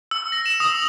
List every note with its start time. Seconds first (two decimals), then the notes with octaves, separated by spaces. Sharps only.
0.11 E6
0.32 A#6
0.46 E7
0.60 D#6
0.75 F#7